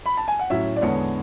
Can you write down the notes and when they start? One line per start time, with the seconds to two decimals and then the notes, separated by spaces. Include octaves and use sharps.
0.06 B5
0.17 A5
0.28 G#5
0.39 F#5
0.50 A2 F#3 C#4 E5
0.76 D5
0.82 E2 D3 G#3 B3 C#5